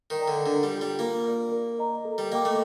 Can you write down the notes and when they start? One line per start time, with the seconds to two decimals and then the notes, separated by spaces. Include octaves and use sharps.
0.10 D#3
0.19 D5 G5 A#5
0.28 D3
0.46 D3 D4
0.63 G3
0.73 F4 A4
0.81 G3
0.99 A#3 F4
1.25 A#4 D5
1.52 A#4
1.79 D#5 A#5
2.05 A4
2.18 G3
2.32 A#3 D#5 G5 D6
2.45 A3